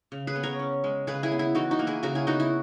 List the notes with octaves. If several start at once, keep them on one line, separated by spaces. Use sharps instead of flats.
C#3
G#4 B4
B3
A#4 C#5
C#4
G#3
C#3 G#4 B4
E4 G#4
B3
E4
E3 D#4 F#4
D#4 F#4
A#3
E4 G#4
C#3 F#4 A#4
E4 G#4
B3 D#4 F#4
E4